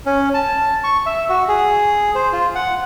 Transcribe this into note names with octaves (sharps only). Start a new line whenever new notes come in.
C#4
A5
C#6
E5
F#4
G#4
C5
F4
F#5